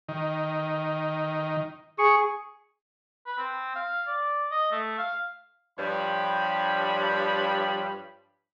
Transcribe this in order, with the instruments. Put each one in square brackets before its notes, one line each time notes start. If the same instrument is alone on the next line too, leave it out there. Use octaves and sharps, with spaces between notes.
[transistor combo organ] D#3
[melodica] G#4 C#6
[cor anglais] B4
C4
F5
D5
D#5
A3
F5
[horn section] G2 F3 G3 C#5 B5